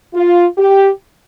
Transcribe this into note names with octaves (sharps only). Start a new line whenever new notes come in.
F4
G4